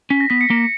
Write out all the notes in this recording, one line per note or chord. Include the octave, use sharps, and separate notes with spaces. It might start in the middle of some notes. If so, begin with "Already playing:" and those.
C#4 B6
A#6
B3 B6
C#7
A#3